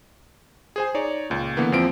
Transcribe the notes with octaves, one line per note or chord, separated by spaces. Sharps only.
G#4 C5 G#5
D#4 C#5 D5
C#2 A#2
D3 E3 A#3 B3
E2 F3 C4 F4 D7